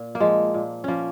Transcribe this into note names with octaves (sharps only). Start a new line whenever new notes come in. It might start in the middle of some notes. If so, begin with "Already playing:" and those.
Already playing: A#2
A#3
F3 G#3
A#2
F3 A#3 C#4